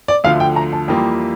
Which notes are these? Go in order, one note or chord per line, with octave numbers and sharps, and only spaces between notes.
D5
D2 D3 F3 A3 F5
G5
A#5
A5
F2 E3 G3 A#3 F4 G5